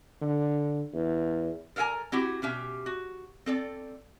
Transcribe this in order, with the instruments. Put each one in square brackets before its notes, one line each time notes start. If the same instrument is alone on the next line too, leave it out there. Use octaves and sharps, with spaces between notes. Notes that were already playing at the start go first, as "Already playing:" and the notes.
[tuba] D3
E2
[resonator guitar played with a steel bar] A4 A#4 F#5 G#5 A#5
C4 E4 F#4 G4
B2 C#4 G4 E5
F#4
C4 A4 D5